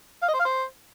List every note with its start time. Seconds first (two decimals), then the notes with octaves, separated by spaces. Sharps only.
0.22 F5
0.28 D#5
0.34 C5
0.39 F5
0.45 C5